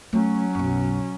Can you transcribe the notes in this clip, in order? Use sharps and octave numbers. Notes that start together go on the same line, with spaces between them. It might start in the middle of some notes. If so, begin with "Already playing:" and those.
F#3 A3 C#4
B1 F#2